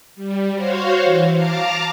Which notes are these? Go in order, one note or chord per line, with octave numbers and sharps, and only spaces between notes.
G3
F#4 C5 C#5 F5
E3
F5 A5 A#5 D6 F6